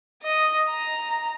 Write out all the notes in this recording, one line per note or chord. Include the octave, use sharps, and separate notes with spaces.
D#5
A#5